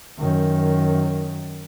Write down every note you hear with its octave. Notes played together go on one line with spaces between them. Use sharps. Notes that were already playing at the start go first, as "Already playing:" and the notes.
F#2 D#3